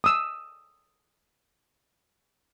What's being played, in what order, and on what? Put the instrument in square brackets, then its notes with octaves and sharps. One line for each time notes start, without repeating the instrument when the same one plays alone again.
[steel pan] D#6 E6